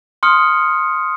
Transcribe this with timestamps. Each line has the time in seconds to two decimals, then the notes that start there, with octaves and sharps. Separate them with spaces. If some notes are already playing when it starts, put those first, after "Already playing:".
0.23 C6 D#6 F6 C#7